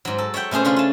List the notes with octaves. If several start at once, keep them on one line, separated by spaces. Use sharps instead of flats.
G#2 F#3
A4
C#5 E5 F#5 G5
B2 A3 C#4 G#4 C5
C#3 C#4 D4 F4
F4 A5